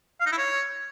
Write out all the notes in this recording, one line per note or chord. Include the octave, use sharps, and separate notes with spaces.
F5
D#4
E4
C#5